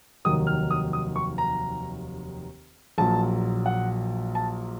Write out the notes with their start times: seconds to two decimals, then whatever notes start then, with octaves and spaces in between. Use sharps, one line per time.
0.25 F1 D#2 D#3 F#3 D#6
0.47 F6
0.71 D#6
0.93 D#6
1.16 C#6
1.38 A#5
2.98 A#1 A#2 F#3 A5
3.66 F#5
4.35 A5